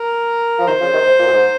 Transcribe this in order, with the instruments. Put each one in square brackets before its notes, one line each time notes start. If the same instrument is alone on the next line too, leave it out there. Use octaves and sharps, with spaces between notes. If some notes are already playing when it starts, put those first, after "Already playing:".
Already playing: [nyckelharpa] A#4
[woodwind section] F3
[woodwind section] C3 D#3 [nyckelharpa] C5
[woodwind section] C#3 F3
C3 D#3
G#2 C3
A#2
F#2
G#2